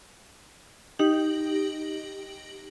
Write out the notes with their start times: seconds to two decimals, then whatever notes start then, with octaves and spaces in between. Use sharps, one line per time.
0.99 D#4 G4 F#7